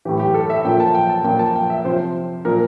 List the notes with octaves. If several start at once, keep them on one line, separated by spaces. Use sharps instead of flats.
A2 E3 G4
G4
A4
E5
A#2 F3 G5
A5
G5
A5
A#2 F3 G5
A5
G5
E5
C3 F3 C5
A#2 F3 A#4